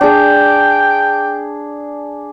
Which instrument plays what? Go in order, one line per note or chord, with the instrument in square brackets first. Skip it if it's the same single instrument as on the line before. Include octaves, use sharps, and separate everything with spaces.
[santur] D4 G#4 [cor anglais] G5